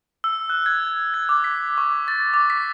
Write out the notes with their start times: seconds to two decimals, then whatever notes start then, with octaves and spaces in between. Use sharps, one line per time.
0.24 E6
0.50 F#6
0.66 G#6
1.14 G#6
1.29 D6
1.44 B6
1.78 C#6
2.08 A6
2.34 D6
2.50 B6